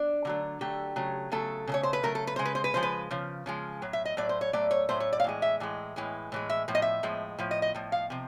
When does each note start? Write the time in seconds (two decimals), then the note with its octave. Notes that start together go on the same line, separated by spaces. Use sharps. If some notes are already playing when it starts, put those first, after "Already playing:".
Already playing: D4
0.25 D3 F#3 A3
0.61 D3 F#3 A3 G4
0.96 C#3 F#3 A3
1.32 C#3 F#3 A3 A4
1.67 C#3 F#3
1.72 A3 C#5
1.83 C5
1.93 B4
2.03 C#3 F#3 A3 A#4
2.15 A4
2.27 B4
2.36 C#3 F3 G#3 C5
2.45 B4
2.55 C5
2.64 B4
2.74 C#3 F3 G#3 C5
2.83 B4
3.11 C#3 F3
3.46 C#3 F3 G#3
3.82 A2 F#3
3.93 E5
4.05 D#5
4.17 A2 F#3 A3 D5
4.29 C5
4.41 C#5
4.53 A2 F#3 A3 D5
4.71 C#5
4.89 A2 F#3 A3 C5
5.00 C#5
5.13 D5
5.20 F5
5.24 A2 E3 G#3
5.42 E5
5.60 A2 E3 G#3
5.96 A2 E3 G#3
6.32 A2 E3 G#3
6.50 E5
6.68 A2 F3
6.75 D#5
6.82 E5
7.03 A2 F3 G#3
7.39 A2 F3
7.51 D#5
7.62 D#5
7.75 A2 F3
7.92 F5
8.10 C3 F3